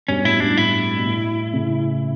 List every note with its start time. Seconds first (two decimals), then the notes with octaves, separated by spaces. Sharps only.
0.08 G2 B2 C#4
0.24 A2 E4
0.40 G2 D4
0.57 A2 E4
0.97 B2
1.05 A2
1.53 A2 C#3